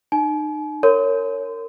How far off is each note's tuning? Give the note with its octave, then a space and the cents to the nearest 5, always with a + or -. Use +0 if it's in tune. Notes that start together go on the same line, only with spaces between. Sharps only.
D#4 -35 G#5 +45
A#4 -25 C#5 +0 C6 -30